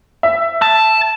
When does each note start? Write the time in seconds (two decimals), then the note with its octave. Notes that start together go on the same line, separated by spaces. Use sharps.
0.23 E5
0.62 A5